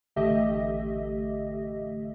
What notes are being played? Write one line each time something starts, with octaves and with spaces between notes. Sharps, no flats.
A1 D3 A3 G4 D#5 E5